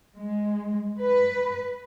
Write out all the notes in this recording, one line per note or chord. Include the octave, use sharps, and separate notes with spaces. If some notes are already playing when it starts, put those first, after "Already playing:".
G#3
B4